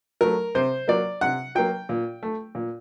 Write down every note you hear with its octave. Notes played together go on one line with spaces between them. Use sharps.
F#3 A3 A#4
C3 C5
F#3 A#3 D5
C3 F#5
F#3 A#3 G5
A#2
A3
A#2